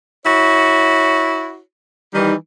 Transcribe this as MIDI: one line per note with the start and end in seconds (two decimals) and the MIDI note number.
0.26 1.60 64
0.26 1.60 66
0.26 1.60 73
2.14 2.34 51
2.14 2.34 52
2.14 2.34 55
2.14 2.34 63